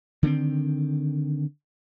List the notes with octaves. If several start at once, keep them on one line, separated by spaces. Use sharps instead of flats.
D3 D#3 A#3 C4